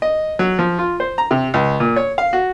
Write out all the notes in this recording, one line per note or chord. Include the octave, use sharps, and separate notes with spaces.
D#5
F#3
F3
F4
C5
A#5
C3
C#2
A#2
C#5
F5
F#4